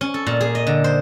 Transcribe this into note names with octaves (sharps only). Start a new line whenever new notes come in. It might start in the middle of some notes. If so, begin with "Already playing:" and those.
C#4
A4
A#2
G#4
D#5
D3
C5